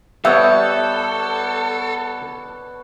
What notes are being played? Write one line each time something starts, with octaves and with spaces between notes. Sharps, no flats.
G3 B3 A4 C#5 E5